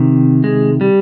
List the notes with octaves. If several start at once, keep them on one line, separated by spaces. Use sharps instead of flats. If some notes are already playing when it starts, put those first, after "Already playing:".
Already playing: C3 D#3
G#3
G3